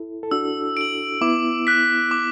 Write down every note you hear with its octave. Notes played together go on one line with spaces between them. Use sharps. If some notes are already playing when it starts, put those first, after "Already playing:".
Already playing: E4 A4
A4
D4 F#4 E6
D7 F#7
B3 E4 D6
F#6 B6
D6